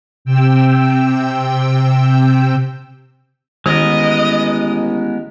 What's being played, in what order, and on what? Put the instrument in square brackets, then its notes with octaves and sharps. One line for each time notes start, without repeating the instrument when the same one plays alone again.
[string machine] C3 G5 E6
[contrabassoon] A1 [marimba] D#3 [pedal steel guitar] G#3 B3 A#4 [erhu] D#5